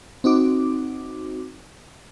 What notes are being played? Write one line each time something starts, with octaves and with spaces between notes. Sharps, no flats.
C4 D#4 F#4 D6